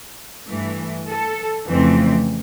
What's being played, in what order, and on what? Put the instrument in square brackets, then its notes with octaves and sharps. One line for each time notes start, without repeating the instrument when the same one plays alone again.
[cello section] G2 E3 A3
A4
F2 C#3 E3 A3 C4